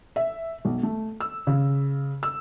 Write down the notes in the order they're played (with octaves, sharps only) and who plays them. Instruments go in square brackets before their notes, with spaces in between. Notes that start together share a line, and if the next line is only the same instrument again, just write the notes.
[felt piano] E5
B1
A3
E6
C#3
E6